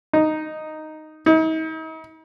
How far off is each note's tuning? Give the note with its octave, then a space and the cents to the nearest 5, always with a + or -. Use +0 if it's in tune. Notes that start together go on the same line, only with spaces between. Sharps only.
D#4 -5
D#4 +40